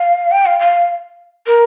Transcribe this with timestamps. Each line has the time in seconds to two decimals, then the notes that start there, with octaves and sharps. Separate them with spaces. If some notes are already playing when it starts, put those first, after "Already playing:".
Already playing: F5
0.31 G5
0.46 F5
0.59 F5
1.46 A#4